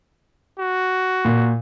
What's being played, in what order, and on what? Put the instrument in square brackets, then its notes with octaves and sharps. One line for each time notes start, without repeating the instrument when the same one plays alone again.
[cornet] F#4
[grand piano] A#2